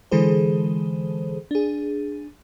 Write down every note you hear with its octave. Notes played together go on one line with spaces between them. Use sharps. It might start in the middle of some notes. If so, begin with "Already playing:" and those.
D3 E3 G#3 G#4 A4 C5
D4 G#4